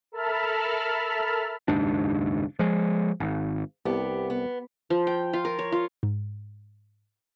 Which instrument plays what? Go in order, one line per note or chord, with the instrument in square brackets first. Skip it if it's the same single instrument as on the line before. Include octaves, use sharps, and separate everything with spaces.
[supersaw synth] A4 A#4 E5 A5 B5 F6
[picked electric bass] F#1 D#2 G#2 D4
F3 G#3
G#1
[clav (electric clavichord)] C2 A5 [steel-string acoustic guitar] B3 G4
[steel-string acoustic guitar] B3
[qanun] F3
G5
F4
A#4
C#5
F4
[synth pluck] G#2